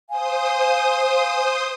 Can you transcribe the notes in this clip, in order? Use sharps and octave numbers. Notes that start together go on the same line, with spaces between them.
C5 F5 G#5 D#6